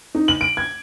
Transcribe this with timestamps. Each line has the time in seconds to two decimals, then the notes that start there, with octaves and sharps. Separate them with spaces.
0.15 D#4
0.28 F#7
0.41 D7
0.57 G#6